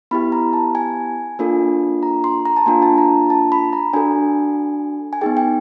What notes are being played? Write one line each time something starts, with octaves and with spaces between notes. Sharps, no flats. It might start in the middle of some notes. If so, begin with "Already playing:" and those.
B3 E4 G4 B5
A#5
A5
G#5
A#3 D4 F4 A4
A#5
C6
A#5
A5
A#3 D4 F4 G#5
A5
A#5
A5
B5
A#5
D4 F#4 A4 G#5
G#5
B3 D#4 G#4 G5
G5